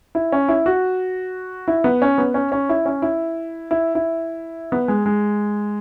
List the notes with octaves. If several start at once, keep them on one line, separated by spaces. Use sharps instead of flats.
E4
C#4
E4
F#4
E4
B3
C#4
B3
C#4
C#4
E4
C#4
E4
E4
E4
B3
G#3
G#3